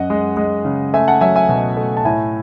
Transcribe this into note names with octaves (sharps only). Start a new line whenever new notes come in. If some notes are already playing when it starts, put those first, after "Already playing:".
Already playing: F#2 D#5 F#5
G#3
G#3
C#3
A3 E5 G#5
F#5 A5
F#3 E5 G#5
E5 G#5
B2
A3
A5
A2 E5 G#5